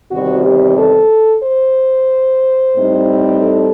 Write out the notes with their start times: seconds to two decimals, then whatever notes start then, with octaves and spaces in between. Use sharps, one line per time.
0.11 E2 C3 D#3 G3 C4 F#4
0.44 G4
0.77 A4
1.44 C5
2.77 A2 G3 C4 D#4
3.43 A4